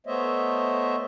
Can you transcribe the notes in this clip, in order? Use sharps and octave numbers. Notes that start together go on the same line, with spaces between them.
A3 B3 C5 C#5 D#5 E5